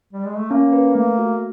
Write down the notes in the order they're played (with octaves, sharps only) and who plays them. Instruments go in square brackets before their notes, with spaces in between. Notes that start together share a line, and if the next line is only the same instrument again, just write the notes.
[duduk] G3
G#3
A3
[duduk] A#3 [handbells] C#4
[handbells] B4
[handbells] A3 [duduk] A#3
[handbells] F#4